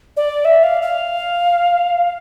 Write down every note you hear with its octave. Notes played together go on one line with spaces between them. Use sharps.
D5
E5
F5
F5